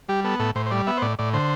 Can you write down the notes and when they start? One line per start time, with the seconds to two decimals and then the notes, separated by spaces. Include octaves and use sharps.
0.09 G3 G4
0.24 B3 A4
0.39 A2 A4
0.55 A2 C5
0.66 C5
0.71 G3 D5
0.87 B3 E5
0.97 C5
1.02 A2 D5
1.19 A2 D5
1.34 D3 C5